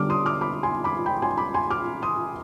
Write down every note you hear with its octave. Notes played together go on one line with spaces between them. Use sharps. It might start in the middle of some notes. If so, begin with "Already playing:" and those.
Already playing: D3 G3 B3 D4 D6 F6
C6 D#6
D6 F6
B5 D6
G#5 C6
B5 D6
G5 B5
G#5 C6
B5 D6
G#5 C6
D6 F6
C6 D#6